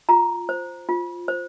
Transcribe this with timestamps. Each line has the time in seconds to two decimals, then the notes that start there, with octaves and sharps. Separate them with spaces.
0.09 F4 A#5
0.49 C5
0.89 F4
1.28 C5